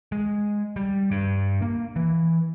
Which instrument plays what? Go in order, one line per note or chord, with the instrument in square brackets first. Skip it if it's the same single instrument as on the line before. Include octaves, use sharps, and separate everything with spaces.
[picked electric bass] G#3
G3
G2
A#3
E3